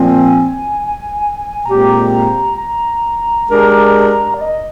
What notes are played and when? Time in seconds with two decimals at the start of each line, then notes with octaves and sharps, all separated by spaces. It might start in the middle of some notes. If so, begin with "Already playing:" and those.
Already playing: A#2 F3 C4 G#5
1.66 A#2 G#3 C4 G4 A#5
2.58 A#5
3.49 G#3 D4 G4 A#4
4.34 D5
4.41 D#5